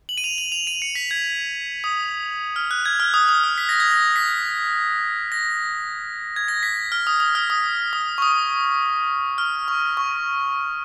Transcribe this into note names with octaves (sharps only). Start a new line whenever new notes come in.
F#7
D#7
F7
F#7
F7
D#7
C#7
B6
G#6
D#6
F6
F#6
G#6
F6
D#6
D#6
F6
B6
A#6
G#6
A#6
B6
A#6
G#6
A#6
B6
F6
D#6
D#6
F6
D#6
D#6
C#6
D#6
F6
C#6
C#6